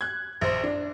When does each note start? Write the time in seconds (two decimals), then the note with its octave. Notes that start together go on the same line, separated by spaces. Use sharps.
0.01 F#6 G#6
0.41 A#1 C5
0.63 D4